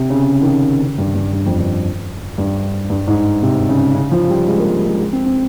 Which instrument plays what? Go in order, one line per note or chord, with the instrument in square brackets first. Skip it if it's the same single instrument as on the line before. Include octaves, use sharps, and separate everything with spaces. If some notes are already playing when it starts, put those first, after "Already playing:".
Already playing: [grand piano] C3
C#3
C#3
D#3
C#3
G2
G2
G2
F2
G2
G2
G2
G#2
C3
C#3
C#3
F3
G3
G#3
A#3
G3
G#3
G#3
C4
C4